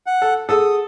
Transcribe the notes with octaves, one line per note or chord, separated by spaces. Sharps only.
F#5
A4
G#4 A4 F#5 D#6 E6